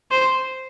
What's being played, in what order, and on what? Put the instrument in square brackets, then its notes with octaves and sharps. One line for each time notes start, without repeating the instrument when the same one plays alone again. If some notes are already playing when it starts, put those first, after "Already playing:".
[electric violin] C5